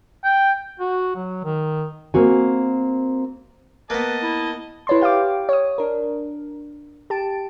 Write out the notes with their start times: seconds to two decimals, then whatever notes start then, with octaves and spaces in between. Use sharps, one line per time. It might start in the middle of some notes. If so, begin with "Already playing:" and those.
0.24 G5
0.80 F#4
1.16 F#3
1.44 D#3
2.14 A#3 C4 F#4 G#5
3.90 A#3 B3 B4 D#5 A5
4.23 E4
4.87 E4 B4 C#5 A5 C6
5.01 G4 F5 G5 D6
5.49 C#5 D#6
5.78 D4 A#4
7.10 G4 A5 D7